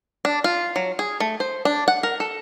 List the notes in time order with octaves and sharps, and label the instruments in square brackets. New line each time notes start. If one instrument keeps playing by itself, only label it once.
[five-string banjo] D4
F4
F#3
G#4
A3
C5
D4
F#5
A#4
A4